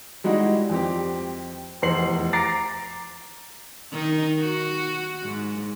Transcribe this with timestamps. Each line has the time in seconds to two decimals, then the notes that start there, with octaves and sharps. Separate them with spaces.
0.24 G3 G#3 D#4 E4 F#4
0.69 F2 C4 G4
1.82 F1 E2 C5 C7 F#7
2.33 A#5 D6 A6 A#6 C7 D7
3.91 D#3 D#4
4.40 F#4
5.24 G#2